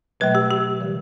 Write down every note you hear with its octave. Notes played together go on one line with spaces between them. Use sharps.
B2 F#3 A3 B4
G4
G4
C#3 E3 G3